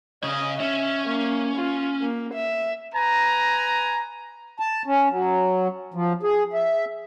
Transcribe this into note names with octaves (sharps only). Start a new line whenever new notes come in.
C#3 C#5 D#5
C#4 E5
A#3
F4
A#3
E5
B4 G#5 A#5
A5
C#4
F#3
F3
G#4
E5